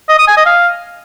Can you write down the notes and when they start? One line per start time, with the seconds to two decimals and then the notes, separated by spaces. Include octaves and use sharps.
0.09 D#5
0.18 D#6
0.27 G#5
0.37 D#5
0.46 F5